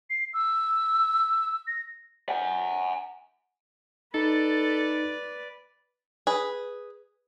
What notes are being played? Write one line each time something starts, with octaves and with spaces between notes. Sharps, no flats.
C7
E6
A#6
F#5 G#5
D#4 A4 B4 D5
G#4 B4